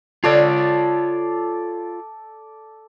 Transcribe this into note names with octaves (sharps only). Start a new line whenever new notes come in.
F4 A4 C#5 D5